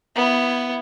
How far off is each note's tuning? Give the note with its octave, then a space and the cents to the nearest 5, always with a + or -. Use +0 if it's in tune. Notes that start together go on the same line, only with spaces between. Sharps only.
B3 +0 E4 +15